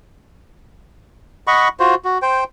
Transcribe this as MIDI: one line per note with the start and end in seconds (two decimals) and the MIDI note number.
1.47 1.68 75
1.47 1.68 78
1.47 1.68 83
1.47 1.68 85
1.80 1.95 65
1.80 1.95 66
1.80 1.95 72
2.05 2.18 66
2.22 2.44 72
2.22 2.44 79